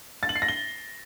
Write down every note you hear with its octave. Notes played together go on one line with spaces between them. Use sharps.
A6
F#7
C7
A#6
G7